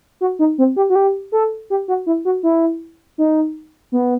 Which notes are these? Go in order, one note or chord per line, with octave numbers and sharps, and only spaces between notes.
F#4
D#4
C4
G4
F#4
G4
A4
G4
F#4
E4
F#4
E4
D#4
B3